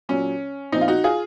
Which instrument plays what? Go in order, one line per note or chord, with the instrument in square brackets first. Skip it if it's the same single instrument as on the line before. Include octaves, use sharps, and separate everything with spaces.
[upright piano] A#2 F#3 C#4
A#2 F3 C4 D#4
F4
D#4 F#4
F4 G#4